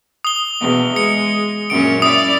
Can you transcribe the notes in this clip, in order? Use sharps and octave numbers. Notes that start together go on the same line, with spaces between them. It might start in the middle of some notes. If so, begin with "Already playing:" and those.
D#6 G7
E2 B2
G#3 C#7
F#2 A#2 C#4 D7
E4 D5 D#6